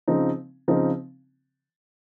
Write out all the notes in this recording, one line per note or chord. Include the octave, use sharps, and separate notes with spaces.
C#3 F3 C4 D#4
C#3 F3 C4 D#4